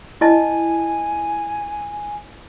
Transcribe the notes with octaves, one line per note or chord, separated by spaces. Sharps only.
E4 D#5 G#5 A5